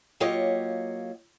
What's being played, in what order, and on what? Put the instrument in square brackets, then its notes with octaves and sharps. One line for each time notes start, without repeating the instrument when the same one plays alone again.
[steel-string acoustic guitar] F#3 A#3 F4 G4 C#5 D#5